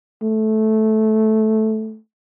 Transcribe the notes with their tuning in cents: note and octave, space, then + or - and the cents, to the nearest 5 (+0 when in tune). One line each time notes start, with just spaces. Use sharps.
A3 -10